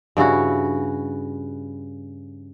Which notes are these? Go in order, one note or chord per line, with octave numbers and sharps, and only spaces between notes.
G2 C#3 E4 F#4